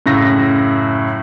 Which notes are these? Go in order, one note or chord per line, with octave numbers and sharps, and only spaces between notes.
F#2 A2 C#3 A#6